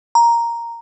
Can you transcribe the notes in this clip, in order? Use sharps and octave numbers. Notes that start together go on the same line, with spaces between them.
A#5